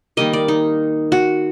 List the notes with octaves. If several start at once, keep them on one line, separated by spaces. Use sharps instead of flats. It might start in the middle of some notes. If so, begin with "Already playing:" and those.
D#3 G3 A#3 D#5
D5
D#4
F#4